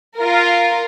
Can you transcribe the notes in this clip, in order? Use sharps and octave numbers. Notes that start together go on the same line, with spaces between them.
F4 A#4